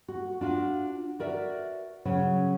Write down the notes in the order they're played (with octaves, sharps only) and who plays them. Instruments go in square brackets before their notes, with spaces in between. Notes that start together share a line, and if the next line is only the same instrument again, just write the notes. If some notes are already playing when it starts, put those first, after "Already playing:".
[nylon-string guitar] F#4
D4 F4 F#4
F#4 A#4 D5 E5
C#3 F#3 C#4